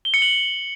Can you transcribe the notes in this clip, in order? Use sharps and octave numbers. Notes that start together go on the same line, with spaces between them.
G7
C#7
F#7